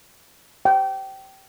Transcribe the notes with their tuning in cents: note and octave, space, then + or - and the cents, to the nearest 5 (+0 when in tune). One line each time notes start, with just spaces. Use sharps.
G5 -20